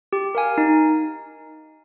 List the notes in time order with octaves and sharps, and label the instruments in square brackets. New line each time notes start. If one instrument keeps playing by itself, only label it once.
[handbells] G4
A#4 F5 G#5
D#4